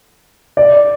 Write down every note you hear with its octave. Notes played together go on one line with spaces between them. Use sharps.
D5